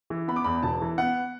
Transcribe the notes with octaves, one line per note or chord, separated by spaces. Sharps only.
E3
B3 B5
D6
E2 B5
E1 A5
E3
B3 F#5